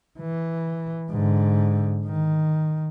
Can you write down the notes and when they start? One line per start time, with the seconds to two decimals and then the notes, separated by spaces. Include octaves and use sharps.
0.19 E3
1.09 G#2 D3
2.06 D#3